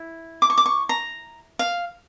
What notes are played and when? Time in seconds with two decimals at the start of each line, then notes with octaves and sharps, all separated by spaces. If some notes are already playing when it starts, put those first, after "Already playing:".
Already playing: E4
0.42 D6
0.50 C#6
0.58 D6
0.66 C#6
0.89 A#5
1.59 F5